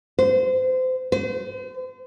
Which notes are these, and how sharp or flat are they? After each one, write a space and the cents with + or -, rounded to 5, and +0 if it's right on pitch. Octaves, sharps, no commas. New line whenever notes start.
C5 -30
C5 -40